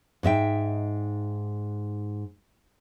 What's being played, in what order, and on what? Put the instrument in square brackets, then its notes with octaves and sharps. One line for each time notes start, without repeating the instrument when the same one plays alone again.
[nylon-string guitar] G#2 D#4 E5 G5